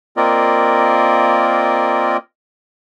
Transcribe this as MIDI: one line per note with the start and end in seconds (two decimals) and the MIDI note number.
0.17 2.17 58
0.17 2.17 60
0.17 2.17 65
0.17 2.17 70
0.17 2.17 74
0.17 2.17 75